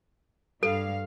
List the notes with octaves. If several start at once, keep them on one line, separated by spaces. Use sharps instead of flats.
G2 G3 A4 F5